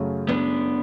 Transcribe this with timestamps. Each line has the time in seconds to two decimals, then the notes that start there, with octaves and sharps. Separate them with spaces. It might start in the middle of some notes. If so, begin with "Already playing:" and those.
Already playing: F#2 C#3 F#3 A3
0.29 B3 D4